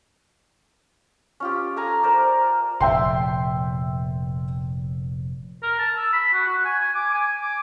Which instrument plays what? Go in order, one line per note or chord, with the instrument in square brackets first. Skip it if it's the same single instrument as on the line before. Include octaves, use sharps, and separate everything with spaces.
[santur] C#4 F4 G4
A4 F5 G#5 A#5
A#4 C5 D5
[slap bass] F1 A#2 [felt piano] E5 G5 C6
[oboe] A#4
A5
E6
B5
F#4
F#4
G#5
G#5
D6
G#5
D6